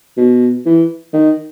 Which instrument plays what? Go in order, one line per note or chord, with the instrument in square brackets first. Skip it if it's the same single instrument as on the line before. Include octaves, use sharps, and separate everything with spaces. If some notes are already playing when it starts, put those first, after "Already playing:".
[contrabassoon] B2
E3
D#3